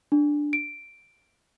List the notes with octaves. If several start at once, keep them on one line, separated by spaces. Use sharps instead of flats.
D4
D7